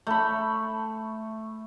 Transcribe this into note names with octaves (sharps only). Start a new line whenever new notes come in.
A3 B5